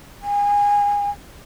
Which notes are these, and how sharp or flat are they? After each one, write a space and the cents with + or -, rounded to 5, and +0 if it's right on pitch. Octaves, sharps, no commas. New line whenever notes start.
G#5 -25